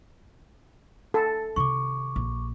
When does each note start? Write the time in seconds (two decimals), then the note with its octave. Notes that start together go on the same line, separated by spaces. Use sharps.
1.14 A4
1.56 C3 D#3 C#6 D6
2.16 A#1